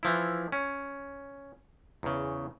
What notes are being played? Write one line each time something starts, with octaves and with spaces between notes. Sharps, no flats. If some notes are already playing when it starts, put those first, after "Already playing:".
E3 F3 E4
C#4
E2 C#3